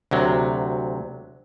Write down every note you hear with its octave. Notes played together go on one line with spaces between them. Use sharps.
D2 C3 F#3